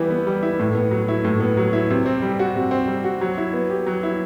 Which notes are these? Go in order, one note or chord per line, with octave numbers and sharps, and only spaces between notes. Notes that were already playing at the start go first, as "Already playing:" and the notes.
Already playing: E3 G3 B3 E4
B3
G3
E4
A2
B3
F#3
E4
A2
B3
F#3
E4
C3
C4
G3
F#4
C3
C4
G3
F#4
F#3
E4
B3
G4
F#3
E4